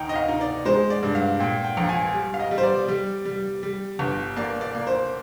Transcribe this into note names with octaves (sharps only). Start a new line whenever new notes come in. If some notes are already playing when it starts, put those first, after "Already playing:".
Already playing: D2 D#4 G5
D#5
F5
D#4
D5
G#3 C5
D5
G2
F5
A#2 G5
G5
A#1
G#5
G3
F5
D#5
G3
C5
D5
G3
G3
G3
G1
A#3 D5
D5
A#3
C5